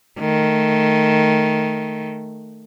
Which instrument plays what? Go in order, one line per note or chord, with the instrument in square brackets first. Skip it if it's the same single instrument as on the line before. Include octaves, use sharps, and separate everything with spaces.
[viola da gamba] D#3 A3